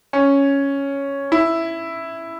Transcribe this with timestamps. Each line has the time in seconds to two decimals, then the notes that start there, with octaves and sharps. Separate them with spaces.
0.13 C#4
1.32 E4